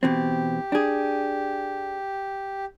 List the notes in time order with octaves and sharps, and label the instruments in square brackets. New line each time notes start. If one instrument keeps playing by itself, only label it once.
[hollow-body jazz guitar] B2 E3 C4 [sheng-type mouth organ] G4
[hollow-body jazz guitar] D4 G#4